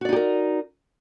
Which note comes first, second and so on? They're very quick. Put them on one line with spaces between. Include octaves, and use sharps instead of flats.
F#4 D5 D#4 G4 A#4